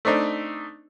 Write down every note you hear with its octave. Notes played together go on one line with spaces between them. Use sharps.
A3 C4 D4 D#4